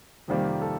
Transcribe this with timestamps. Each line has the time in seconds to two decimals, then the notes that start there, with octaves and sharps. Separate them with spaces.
0.28 F2 C3 D#3 G3 A#3
0.61 A4